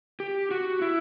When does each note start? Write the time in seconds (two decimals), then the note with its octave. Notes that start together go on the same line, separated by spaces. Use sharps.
0.20 G4
0.51 F#4
0.82 E4